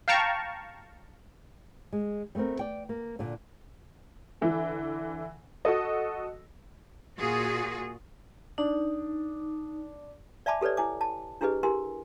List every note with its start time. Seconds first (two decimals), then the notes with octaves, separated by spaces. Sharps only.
0.08 F5 G5 A5 A#5 C#6
1.93 G#3
2.35 G3 A3 B3 C4 A#4
2.59 D5 G5
2.89 A#3
3.19 A#2 D3
4.41 D3 E3
5.65 F#4 A4 D#5
7.18 A#2 F4 F#4 G#4
8.58 D4 D#4
10.46 D5 E5 G#5 A5 B5 D6
10.61 G4 A4 B4 C#5 D5
10.77 E4 G#5 D6
11.01 A5
11.41 D4 E4 G4 G#4 B4 D#5
11.63 E4 G4 A#4 G#5 C6